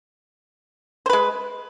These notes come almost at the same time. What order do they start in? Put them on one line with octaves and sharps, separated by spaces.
C5 B4 G#3